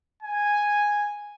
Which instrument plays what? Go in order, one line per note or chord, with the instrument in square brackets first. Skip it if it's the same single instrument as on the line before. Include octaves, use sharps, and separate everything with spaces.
[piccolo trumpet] G#5